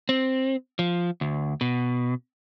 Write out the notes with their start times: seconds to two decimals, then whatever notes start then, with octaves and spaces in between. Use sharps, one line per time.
0.09 C4
0.79 F3
1.21 D2
1.61 B2